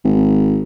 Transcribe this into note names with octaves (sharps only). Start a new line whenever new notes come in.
G#1